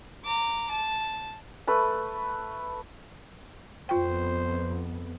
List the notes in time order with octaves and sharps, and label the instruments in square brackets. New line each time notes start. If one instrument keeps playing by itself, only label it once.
[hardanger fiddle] A#5 D6
A5
[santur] A3 B4 B5
[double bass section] F2 B3 [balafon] F4 G5 [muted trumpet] C5